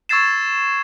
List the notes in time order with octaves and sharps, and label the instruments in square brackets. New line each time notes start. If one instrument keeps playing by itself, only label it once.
[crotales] C#6 E6 G#6 A6 C7 E7